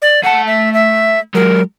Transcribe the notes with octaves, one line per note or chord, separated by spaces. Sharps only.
D5
A3 F#5 A5
E5
E5
F#3 G#3 A#4